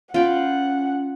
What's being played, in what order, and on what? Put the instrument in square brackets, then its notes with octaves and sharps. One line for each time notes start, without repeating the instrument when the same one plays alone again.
[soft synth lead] C#4 [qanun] F4 G5 B5 [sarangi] F#5